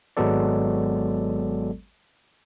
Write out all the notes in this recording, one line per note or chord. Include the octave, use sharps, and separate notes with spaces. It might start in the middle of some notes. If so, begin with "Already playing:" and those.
G#1 F#3 G#3 B3 A4 D5